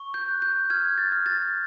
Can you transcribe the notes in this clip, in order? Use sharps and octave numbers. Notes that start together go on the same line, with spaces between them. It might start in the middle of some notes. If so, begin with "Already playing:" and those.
Already playing: C#6
G6
F#6
G6
F6 G#6
A6
F6
A6